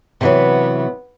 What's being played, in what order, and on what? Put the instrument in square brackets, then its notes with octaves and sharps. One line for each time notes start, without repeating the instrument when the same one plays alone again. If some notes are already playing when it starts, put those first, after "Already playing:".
[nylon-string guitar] C3 E3 F#3 [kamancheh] B3